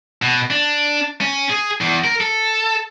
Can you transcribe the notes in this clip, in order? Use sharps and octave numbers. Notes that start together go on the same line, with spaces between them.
B2
D4
C#4
G#4
E2
A#4
A4